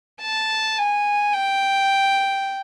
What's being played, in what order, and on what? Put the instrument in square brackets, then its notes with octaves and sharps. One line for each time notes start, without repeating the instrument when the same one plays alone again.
[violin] A5
G#5
G5